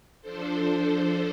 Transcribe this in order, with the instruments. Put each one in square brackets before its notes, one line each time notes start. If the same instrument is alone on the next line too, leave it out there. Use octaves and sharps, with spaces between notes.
[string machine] F3 D4 A4 C5